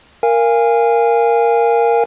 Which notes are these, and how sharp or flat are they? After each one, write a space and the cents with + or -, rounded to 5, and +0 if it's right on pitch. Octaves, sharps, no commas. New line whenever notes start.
A#4 +0 F5 -20 G#5 -20